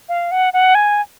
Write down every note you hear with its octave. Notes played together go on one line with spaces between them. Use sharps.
F5
F#5
F#5
G#5